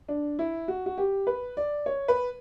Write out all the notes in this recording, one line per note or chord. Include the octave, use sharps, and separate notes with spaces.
D4
E4
F#4
F#4
G4
B4
D5
C#5
B4